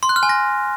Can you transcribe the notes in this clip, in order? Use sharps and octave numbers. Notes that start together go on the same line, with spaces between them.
C6
F#6
F6
G#5
A#6